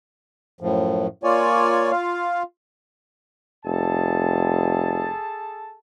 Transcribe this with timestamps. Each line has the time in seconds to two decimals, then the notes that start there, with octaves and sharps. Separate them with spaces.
0.61 F#2 A2 F3
1.23 A#3 F4 C#5 D5 G#5
1.91 F4 F5
3.65 F1 G#4 A4 A5